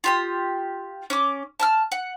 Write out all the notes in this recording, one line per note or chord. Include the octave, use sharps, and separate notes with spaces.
F4 G4 D#6
C#4 D6
A5 A#5 F6
F#5